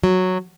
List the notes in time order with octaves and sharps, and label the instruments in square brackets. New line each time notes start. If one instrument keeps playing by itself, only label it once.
[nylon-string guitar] F#3